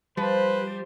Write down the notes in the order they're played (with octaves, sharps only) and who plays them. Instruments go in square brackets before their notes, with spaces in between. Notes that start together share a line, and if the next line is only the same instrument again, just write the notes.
[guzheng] F3 [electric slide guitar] G3 [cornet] B4 [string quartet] C5